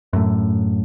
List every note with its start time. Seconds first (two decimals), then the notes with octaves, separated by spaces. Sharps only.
0.13 F#2 A2